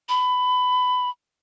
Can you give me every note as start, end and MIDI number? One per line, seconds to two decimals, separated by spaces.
0.09 1.10 83